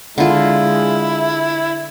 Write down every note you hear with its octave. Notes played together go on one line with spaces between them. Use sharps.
D3 G#3 E4 F4